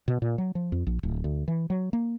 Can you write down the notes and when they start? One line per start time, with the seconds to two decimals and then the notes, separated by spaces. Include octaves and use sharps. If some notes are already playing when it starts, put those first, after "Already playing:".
0.08 B2
0.22 A#2
0.38 F#3
0.55 F3
0.72 F2
0.87 A#1
1.03 D1
1.24 D2
1.48 E3
1.70 F#3
1.93 A#3